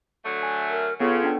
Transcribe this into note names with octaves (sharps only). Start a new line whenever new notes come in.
D3 F#3 A3
G#5
A#4
C#3 B3 F4 A4
D4 G5